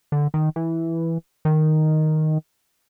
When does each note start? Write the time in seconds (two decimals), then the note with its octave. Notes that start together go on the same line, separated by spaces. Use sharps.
0.12 D3
0.34 D#3
0.56 E3
1.45 D#3